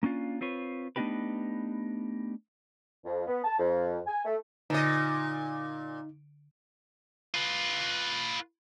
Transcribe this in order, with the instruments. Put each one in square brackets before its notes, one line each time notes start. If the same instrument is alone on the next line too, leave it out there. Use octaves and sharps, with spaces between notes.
[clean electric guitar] A#3 C#4 D4 F4
C4 F4 B4 C#5
A3 B3 D4 D#4 G4 B4
[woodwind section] F2
B3
A5
F2
G#5
A3
[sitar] A#2 D#5 [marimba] D3 [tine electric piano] D#4
[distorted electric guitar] F4 B4